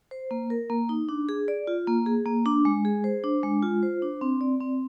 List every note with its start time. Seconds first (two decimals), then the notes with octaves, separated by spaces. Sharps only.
0.11 C5
0.31 A#3
0.50 A#4
0.70 A#3
0.89 D#4
1.09 D4
1.29 G#4
1.48 D5
1.67 F4
1.87 A#3
2.06 G#4
2.26 A#3
2.46 D4
2.65 G#3
2.85 G#4
3.04 C5
3.24 D4
3.43 G#3
3.63 F4
3.83 C5
4.02 D4
4.21 C4
4.41 D5
4.60 C4